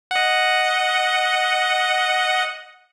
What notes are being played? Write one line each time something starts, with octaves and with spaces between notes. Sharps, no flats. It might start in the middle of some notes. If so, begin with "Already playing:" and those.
D#5 F#5